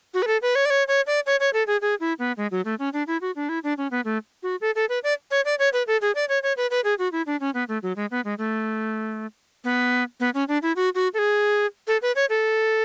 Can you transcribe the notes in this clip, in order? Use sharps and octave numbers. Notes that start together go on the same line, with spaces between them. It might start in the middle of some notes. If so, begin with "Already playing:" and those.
F#4
B4
A4
B4
C#5
D5
C#5
C#5
D5
C#5
C#5
A4
G#4
G#4
E4
B3
G#3
F#3
A3
C#4
D4
E4
F#4
D4
E4
D4
C#4
B3
A3
F#4
A4
A4
B4
D5
C#5
D5
C#5
B4
A4
G#4
D5
C#5
C#5
B4
B4
G#4
F#4
E4
D4
C#4
B3
A3
F#3
G#3
B3
G#3
A3
B3
B3
C#4
D4
E4
F#4
F#4
A4
G#4
A4
B4
C#5
A4